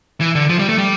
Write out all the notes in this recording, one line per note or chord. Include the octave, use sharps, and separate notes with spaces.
E3
D3
F3
G3
A3
G3